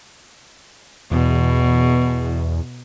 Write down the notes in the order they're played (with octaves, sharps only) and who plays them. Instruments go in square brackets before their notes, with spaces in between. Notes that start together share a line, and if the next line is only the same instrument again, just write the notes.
[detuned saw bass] E2 [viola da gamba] B2